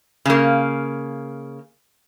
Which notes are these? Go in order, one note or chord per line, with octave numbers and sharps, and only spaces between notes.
C#3 A#3